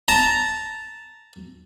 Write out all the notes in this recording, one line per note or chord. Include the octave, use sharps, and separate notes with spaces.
A5 A#5